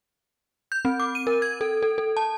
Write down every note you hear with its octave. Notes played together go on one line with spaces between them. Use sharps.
G6
C4
D6
D#7
A#4
G#6
A4
A4
A4
A5